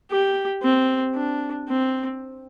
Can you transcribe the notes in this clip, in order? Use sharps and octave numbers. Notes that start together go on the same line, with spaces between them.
G4
C4
D4
C4